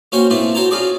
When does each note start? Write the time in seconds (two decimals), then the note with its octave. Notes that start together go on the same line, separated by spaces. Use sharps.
0.12 A#3 C#4 F#4 C5 C#5 G5
0.30 A3 B3 C4 D4 E4 F4
0.55 F#4 C5 C#5 G5 A5 A#5
0.71 C#4 F4 F#4 G#4 D5